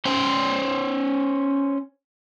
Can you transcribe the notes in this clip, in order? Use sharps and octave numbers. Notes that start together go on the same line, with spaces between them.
C#4 C5